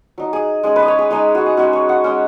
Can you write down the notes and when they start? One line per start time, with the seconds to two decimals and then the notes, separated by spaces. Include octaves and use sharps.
0.18 F#3 D#4
0.33 G#4
0.63 G#3 C#4 G#4
0.76 B4
0.83 D#5
0.88 C#5
0.99 G#4
1.10 G#3 D#4 G#4
1.35 F#4
1.46 G#4
1.57 G#3 C#4 F#4
1.73 C#5
1.89 F#5
2.04 G#3 C#4